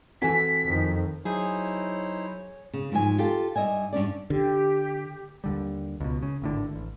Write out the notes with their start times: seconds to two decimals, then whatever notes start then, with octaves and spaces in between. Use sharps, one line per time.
0.22 E3 C4 F#4 A4 G#5 B6
0.65 F2 D#3
1.25 F#3 D#4 E4 G#4 C5 C#5
2.73 C#3
2.92 G#2 F3 F#3 A4 G#5
3.18 F4 G4 A4
3.56 G2 D#5 E5 G#5
3.93 G2 C#4 D4 D5
4.30 D3 G4
5.44 D#2 D3 G3
6.00 C#2 B2
6.23 C#3
6.42 G#1 A2 D3
6.76 A1